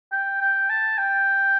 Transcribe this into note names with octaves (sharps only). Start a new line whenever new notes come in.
G5
G5
A5
G5